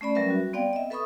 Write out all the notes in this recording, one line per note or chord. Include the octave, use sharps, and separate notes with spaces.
A3 C#4 D5 B5
F#3 G3 C#4 A#4 B4 E5
G3 F#4
B3 C4 D5 F5 G5
D#5 E5
A4 B4 E5 B5 C#6 D#6